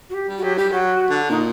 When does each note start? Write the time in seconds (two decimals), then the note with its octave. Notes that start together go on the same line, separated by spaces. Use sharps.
0.10 F#4
0.14 G4
0.28 G3
0.38 F#4
0.43 F#3 G4
0.57 G3 G4
0.72 F#3 F#4
1.10 D3
1.30 A#2 D#4